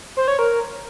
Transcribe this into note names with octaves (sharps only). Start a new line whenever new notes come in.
C5
C#5
A#4